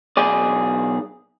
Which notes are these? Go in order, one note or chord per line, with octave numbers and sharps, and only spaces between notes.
B1 G#4 D5